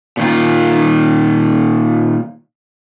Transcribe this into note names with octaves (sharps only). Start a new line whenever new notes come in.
A#2 D#3 F4